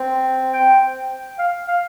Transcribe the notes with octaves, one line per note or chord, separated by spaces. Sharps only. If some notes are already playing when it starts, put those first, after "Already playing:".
Already playing: C4
G5
F5
F5